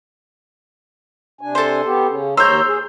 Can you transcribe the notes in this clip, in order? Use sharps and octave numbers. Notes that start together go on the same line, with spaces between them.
C3 D4 G#5
A4 C5
B3 G4
C#3 C#4
D#2 C5 C#5 A#5 E6 G6
G#4